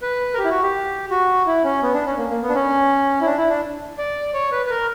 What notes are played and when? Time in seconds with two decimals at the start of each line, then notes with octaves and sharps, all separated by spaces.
0.02 B4
0.34 A#4
0.38 G4
0.44 E4
0.50 F#4
0.62 G4
1.10 F#4
1.46 E4
1.64 C#4
1.82 B3
1.94 D4
2.06 C#4
2.18 A#3
2.30 A#3
2.42 B3
2.49 D4
2.54 C#4
3.21 E4
3.26 D4
3.38 E4
3.50 D4
3.98 D5
4.34 C#5
4.52 B4
4.66 B4
4.70 A#4